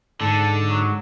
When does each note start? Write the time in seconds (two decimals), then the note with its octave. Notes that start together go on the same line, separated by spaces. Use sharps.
0.21 G#2 D3 A4
0.69 F#3